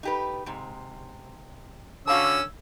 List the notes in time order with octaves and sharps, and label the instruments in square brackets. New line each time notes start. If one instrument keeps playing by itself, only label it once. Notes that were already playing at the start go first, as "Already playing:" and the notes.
[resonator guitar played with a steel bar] D#4 G4 B4
G#2 C3
[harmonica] D3 C#4 E6 [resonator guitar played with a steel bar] F#4 F5 A5